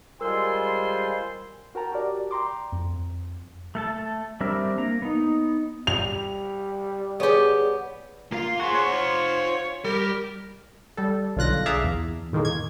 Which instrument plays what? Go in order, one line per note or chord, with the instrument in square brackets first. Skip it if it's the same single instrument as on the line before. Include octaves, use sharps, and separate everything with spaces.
[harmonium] G3 G#3 F4 [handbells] A#4 E6 [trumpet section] C5 G#5 C6
[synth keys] F#4 A#4 G5 A5 A#5
F#4 G4 A#4 D5
G5 A#5 C6 D6
F2
[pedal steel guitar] A3 A4 A5
G3 C4 D4 A#4 E5
A#3 A#5
B3 D#4
[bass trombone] G3 [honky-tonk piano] F7
[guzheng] B3 G4 [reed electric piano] G#4 C#5 D5
[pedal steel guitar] A#3 F5 [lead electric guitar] F4
[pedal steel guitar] F#4 G#4 C6 [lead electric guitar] C5 F#5
[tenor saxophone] C#5
[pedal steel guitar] F4
[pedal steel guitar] G3 [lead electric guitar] G4 [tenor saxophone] A#4
[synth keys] G3 A4
B1 D3 F4 F#6 A#6
G#4 D5 E5 F5 A5 A#5
E2
A2 D#3 G#3 A#3
G#6